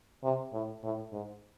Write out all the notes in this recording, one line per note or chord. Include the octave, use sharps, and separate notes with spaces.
C3
A2
A2
G#2